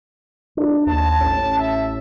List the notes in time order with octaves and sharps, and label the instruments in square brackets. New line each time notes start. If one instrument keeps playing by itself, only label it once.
[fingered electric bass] D4
[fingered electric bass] D#2 [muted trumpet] A5
[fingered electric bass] A1 C#4
[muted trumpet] E5